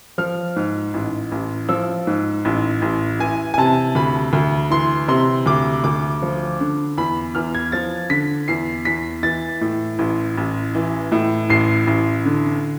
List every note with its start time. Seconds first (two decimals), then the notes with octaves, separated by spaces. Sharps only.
0.18 F3 F6
0.56 G#2
0.94 A1
1.32 A1
1.69 F3 E6
2.07 G#2
2.45 A1
2.82 A1
3.20 E3 G#5
3.54 G#5
3.58 C3 A5
3.95 D2 B5
4.33 D2
4.70 E3 C6
5.08 C3 C6
5.46 D2 D6
5.84 D2 D6
6.23 F3
6.60 D3
6.98 E2 B5
7.35 E2 F6
7.55 G#6
7.72 F3 A6
8.10 D3 B6
8.48 E2 C7
8.85 E2 B6
9.23 E3 A6
9.61 A2
9.99 A1
10.37 A1
10.75 E3
11.12 A2
11.50 A1 C7
11.87 A1
12.25 D3